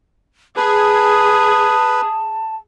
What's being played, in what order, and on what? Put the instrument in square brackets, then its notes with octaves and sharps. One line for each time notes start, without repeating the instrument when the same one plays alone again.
[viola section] G#4 [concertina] B4 [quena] A5 [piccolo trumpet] D#6